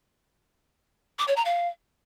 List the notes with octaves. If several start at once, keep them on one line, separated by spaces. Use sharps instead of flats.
D6
C#5
A#5
F5